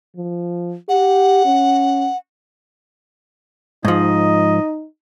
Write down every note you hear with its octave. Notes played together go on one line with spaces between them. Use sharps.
F3
G4 F#5
C#4
G#2 F3 D#4 D#5